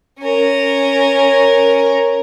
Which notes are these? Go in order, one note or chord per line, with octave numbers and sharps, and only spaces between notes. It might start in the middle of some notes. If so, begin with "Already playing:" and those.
C#4 A#4